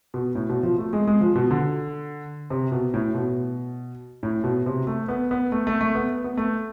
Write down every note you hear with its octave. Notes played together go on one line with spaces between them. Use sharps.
B2
A2
B2
F3
A3
G#3
G#3
F3
B2
D3
C3
B2
A2
B2
A2
B2
C3
A3
B3
B3
A3
A3
A3
B3
B3
A3